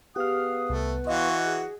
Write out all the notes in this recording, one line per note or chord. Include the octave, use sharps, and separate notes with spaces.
B3 G4 G#4 B4 F5 D#6 F6
C2 A3
E3 F#4 D#5 F5 C6 C#6
G#4